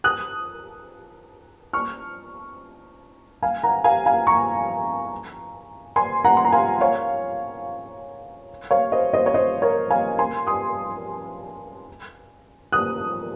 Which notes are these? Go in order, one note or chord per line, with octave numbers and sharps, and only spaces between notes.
D#6 F#6
C#6 F6
F5 G#5
F#5 A#5
F5 G#5
F5 G#5
A#5 C#6
G#5 C6
F#5 A#5
C6
A#5
F5 G#5
C#5 F5
C#5 F5
C5 D#5
C5 D#5
C#5
C5 D#5
A#4 C#5
F5 G#5
G#5 C6
C6 D#6
D#6 F#6